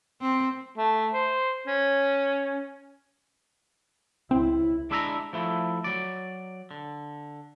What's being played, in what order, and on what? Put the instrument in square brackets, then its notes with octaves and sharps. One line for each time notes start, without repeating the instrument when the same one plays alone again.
[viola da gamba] C4
[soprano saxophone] A3
C5
C#4
[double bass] C#2 E4 [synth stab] C4
[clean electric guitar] G#3 D4 E4 E5 G5 A#5
F3 A3 E4
F#3 D5
D3